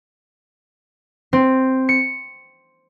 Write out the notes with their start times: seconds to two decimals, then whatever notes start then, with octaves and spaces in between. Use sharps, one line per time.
1.33 C4
1.89 C#7